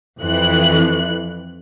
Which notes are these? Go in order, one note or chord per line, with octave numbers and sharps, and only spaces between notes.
F2 E3 F#6